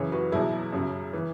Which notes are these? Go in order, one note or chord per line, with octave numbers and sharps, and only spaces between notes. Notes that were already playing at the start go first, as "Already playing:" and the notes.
Already playing: F#2 C#3 E3 G#4 C#5
F#4 B4
E2 B2 F#3 E4 G#4
F#2 C#3 F#3
E3